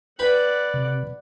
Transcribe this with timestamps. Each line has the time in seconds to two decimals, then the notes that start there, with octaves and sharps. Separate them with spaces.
0.19 B4 D5 F#5 G5 B5
0.74 C3